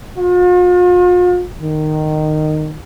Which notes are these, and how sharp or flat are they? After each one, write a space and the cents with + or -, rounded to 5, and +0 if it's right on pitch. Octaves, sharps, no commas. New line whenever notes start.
F4 +45
D#3 -15